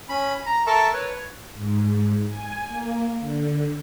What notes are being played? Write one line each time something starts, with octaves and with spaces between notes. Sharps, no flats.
C#4 B5
A#5
A4 A#4 E5 A5 C#6
B4 C#5
G#2
G#5
A#3
D3